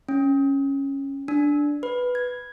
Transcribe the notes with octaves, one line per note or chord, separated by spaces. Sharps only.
C#4
D4
B4
G#6